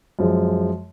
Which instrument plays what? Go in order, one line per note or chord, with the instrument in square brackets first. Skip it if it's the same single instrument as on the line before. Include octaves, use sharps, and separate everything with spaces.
[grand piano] F#2 F3 G#3